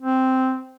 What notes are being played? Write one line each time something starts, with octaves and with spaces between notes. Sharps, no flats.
C4